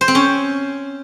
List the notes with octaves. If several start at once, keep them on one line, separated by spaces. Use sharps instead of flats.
C5
C4
C#4